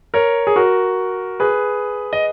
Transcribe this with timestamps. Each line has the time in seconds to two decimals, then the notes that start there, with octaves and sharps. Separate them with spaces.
0.14 A#4 C#5
0.47 G#4
0.56 F#4 A#4
1.40 G#4 B4
2.13 D#5